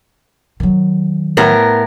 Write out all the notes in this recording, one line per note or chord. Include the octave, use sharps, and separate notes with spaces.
D#3 F#3
A2 B3 A#4